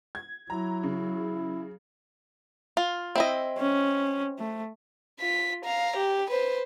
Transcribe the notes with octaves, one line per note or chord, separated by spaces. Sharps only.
G#6
F#3 E4 A#5
C#3
F4
C4 E4 D#5
C#4
A3
F4 B6
F5 A#5
G4
B4 C5